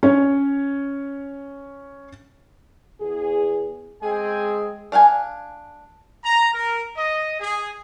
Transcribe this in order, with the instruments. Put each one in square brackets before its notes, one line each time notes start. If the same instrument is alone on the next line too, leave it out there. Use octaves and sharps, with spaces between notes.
[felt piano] C#4 C#5
[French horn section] E2 G#4
[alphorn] G#3 [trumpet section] C4 G5 G#5 [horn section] G#4
[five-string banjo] D4 F5 F#5 G#5
[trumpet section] A#5
A#4
D#5
G#4